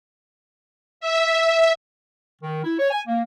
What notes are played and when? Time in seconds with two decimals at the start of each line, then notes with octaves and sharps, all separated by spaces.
1.01 E5
2.42 D#3
2.64 E4
2.80 C#5
2.91 G#5
3.08 A#3